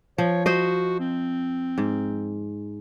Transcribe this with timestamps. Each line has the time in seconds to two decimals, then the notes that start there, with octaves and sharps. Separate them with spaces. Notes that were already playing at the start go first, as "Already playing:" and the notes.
0.18 F3 C#5
0.46 F#4 C5 D#5
1.00 C4
1.78 G#2